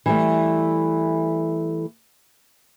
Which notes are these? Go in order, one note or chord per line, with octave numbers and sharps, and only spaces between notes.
E3 G3 A3